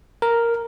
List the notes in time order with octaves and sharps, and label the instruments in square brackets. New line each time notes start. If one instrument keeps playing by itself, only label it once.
[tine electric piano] A#4